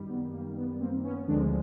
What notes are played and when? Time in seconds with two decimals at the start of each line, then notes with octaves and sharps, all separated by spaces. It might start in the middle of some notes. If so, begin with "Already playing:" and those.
Already playing: F#2 D#3 G3
0.09 B3
0.33 A#3
0.57 B3
0.80 A#3 C4
1.04 B3 C#4
1.28 D2 D3 F3 G#3 C4 D4